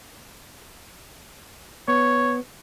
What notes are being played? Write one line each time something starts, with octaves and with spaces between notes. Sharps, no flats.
B3 C#5